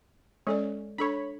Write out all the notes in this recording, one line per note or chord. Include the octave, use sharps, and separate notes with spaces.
G#3 C#4 A4 D5
D4 A4 C#5 B5